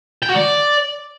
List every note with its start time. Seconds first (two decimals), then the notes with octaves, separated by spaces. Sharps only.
0.23 G5
0.29 F#4
0.35 D5